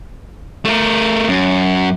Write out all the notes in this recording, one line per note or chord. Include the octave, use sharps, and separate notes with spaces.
A3 A#4
F#2